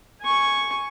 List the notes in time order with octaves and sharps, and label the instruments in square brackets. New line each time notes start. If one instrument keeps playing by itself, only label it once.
[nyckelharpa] G#5 C#6